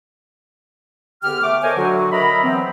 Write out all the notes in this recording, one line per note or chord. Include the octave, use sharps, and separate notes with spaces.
E2 D3 B3 G4 G5 F6
A3 D6
A4 A#4 C5 C#5 D#5 G#5
D3 F#3 F#4
A#4 D#5 E5 A#5 B5
E3 F#3 B3 C4